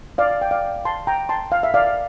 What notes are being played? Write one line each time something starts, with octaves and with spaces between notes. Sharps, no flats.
D5 F5
G5
D5 F5
A5 C6
G5 A#5
A5 C6
F5
E5
D5 F5